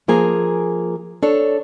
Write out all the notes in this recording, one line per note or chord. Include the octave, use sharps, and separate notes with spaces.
F3 A#3 G#4 G#5 A#5
D4 A4 C#5